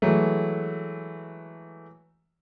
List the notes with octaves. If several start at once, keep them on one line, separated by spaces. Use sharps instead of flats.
E3 F#3 G#3 A3